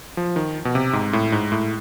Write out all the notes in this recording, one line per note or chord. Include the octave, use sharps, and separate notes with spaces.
F3
D#3
B2
C3
G#2
A2
G#2
A2